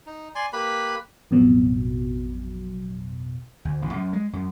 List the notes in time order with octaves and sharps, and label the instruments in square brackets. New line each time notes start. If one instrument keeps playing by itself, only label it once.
[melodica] D#4
D5 G#5 C6
A#3 G4 B4 B5
[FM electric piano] A1 F2 B2 F#3
[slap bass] D2
A1
F#2
G#3
F#2